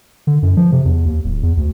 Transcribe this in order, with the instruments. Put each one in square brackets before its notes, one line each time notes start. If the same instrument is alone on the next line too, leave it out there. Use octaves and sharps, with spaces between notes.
[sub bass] D3
F#2
F3
C3
E2
D#2
D1
E2
D2